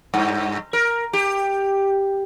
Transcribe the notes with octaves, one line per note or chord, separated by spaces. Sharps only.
G2
A#4
G4